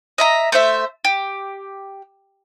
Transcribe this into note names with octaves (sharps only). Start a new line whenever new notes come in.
D#5 E5 A#5
A3 C5 E5
G4